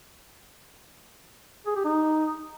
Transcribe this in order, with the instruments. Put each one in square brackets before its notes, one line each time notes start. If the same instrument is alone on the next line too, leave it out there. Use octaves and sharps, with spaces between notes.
[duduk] G#4
G4
D#4